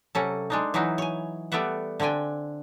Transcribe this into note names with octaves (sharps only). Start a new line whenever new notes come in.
C3 F#3 C#4 A4
G#3 D4 D#4
E3 F#3 D#4 E4 F#4
C#5 G#5
G3 A3 B3 D5 E5 F#5
D3 C4 D4 G5 G#5